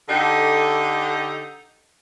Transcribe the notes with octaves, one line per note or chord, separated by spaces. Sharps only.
D3 D#4 G4 A4